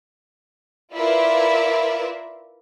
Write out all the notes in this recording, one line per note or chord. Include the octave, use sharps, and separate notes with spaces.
E4 F4 A#4 B4 D5 E5